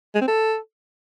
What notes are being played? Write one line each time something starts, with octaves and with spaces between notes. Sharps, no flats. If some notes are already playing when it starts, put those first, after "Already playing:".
G#3
C4
A4